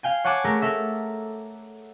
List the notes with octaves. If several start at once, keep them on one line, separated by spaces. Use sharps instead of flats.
F5 G5 G#5
C#5 F#5 G#5 A5 D6
A3 G#4 A#4
A4 A#4 E5